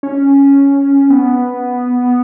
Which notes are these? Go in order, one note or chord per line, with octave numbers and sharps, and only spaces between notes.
C#4
B3